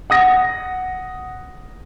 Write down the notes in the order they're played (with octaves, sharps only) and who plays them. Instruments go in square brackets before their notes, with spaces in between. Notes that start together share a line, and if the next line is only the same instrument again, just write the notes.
[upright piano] F#5 D#6 A#6